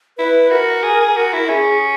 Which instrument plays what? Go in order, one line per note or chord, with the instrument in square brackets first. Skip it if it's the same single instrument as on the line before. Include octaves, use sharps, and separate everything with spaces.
[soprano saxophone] E4 [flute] B4
[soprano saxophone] F#4 [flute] A#4
[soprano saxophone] G#4
G#4
F#4
E4
[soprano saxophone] C#4 [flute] G#4